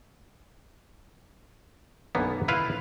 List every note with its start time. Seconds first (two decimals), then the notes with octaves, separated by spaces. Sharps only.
2.15 B1 F#2 D3 A#3 B3
2.48 E4 F4 B4 F5